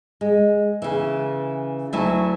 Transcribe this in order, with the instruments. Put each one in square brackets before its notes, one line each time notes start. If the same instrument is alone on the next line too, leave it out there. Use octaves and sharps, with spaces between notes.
[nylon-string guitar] G#3
C#3 E3
D2 F#3 E4 G#5 A5